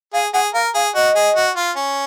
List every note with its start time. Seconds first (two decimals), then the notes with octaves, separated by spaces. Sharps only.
0.13 G#4 F5
0.34 G#4 F#5
0.54 A#4 F5
0.75 G#4 F5
0.95 F#4 D#5
1.15 G#4
1.36 F#4
1.56 F4
1.76 C#4